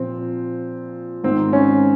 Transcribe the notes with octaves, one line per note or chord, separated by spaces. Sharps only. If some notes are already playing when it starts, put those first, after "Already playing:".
Already playing: A#2 F3 C4
G#2 D#3 C4
C#4